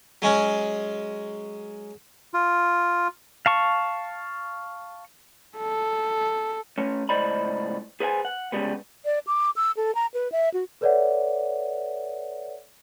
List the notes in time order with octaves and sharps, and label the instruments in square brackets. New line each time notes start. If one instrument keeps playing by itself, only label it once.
[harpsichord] F#3 G#3 C#4
[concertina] F4
[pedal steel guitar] F5 A5 C#6
[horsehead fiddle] A4
[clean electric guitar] A3 C#4
C#2 A2 C5 D5 D#5 B5
G#4 B4 C5 F#5 G#5
F#5
C2 C#3 E3 G3 G#3 B3
[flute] D5
D6
E6
A4
A#5
B4
E5
F#4
[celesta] A4 B4 C#5 D5 E5 F#5